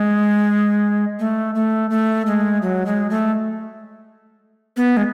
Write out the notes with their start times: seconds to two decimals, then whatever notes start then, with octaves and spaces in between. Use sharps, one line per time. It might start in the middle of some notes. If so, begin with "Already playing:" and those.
Already playing: G#3
1.19 A3
1.55 A3
1.90 A3
2.26 G#3
2.62 F#3
2.86 G#3
3.10 A3
4.77 B3
4.97 G#3